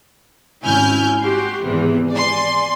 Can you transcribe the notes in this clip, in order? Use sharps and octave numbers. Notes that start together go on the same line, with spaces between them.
G#1 C#4 E4 G#5 F6 G6
F#4 G4 C6
G#1 E2 C3 E3
D5 G#5 C6